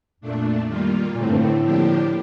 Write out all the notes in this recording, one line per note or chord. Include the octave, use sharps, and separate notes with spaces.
F2 A#2 A3 D4
D#3 G3 A#3 F4
A#2 D3 A3 C4
A2
G2
A2
D3 F3 A#3 D4 G4